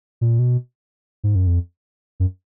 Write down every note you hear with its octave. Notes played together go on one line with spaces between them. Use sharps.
A#2
B2
G#2
F#2
F2
F#2